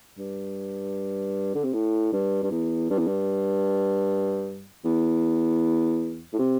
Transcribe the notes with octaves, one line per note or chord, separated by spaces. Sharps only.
G2
D3
C3
A2
G2
G2
E2
G2
E2
G2
E2
A2
C3